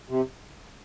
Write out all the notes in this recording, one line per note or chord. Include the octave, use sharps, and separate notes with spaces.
C3